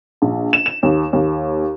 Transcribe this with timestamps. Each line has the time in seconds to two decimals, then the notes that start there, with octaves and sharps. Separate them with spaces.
0.22 A#1
0.53 E7
0.66 E7
0.83 D#2
1.13 D#2